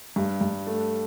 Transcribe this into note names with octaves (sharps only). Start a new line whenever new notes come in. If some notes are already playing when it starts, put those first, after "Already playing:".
G2
G2
A3